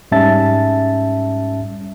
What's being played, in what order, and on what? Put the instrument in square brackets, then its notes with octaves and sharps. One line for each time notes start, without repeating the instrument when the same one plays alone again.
[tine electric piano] G#2 G3 C#4 E5 A5 A6